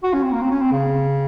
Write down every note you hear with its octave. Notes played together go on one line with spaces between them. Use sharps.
F#4
C#4
C4
A#3
C4
C#4
C4
C#3